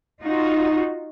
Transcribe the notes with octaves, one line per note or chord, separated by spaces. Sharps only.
D#4 F4 F#4